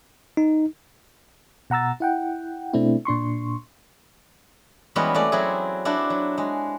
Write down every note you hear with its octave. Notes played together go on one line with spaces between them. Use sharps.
D#4
B2 F#5 A#5 E6 A6
E4 F#5 G5
B2 A3 C4 D4 E4
A#2 D4 C6 C#6
E3 G3 G#3 B3 C#4 F#4
A3 C4 F#4 D5
F#3 C4 E4 F#4 G#4
D4 E4 F#4 C5 D5
F#3
G#3